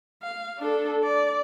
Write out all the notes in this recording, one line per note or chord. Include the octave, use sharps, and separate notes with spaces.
F5
D4 A4
D5